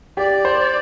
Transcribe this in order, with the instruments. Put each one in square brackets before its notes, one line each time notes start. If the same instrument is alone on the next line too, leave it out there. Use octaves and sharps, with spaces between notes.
[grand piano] G4 [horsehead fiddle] D5
[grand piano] C5